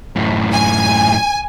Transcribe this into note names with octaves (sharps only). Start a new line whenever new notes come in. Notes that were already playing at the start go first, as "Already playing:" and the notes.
F#2 A2
G#5